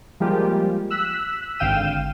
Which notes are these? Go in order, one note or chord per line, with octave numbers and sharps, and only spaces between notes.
F3 G3 G#3 A#3 F4 G4
E6 F#6 B6
G#1 D3 F5 G5 D#7 E7